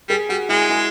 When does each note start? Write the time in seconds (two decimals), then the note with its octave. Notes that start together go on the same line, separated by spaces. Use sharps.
0.09 G3 G#4
0.29 G3 F#4
0.49 G#3 E4
0.69 E4